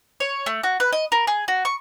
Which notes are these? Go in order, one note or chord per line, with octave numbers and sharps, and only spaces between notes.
C#5
A3
F#4
B4
D#5
A#4
G#4
F#4
C#6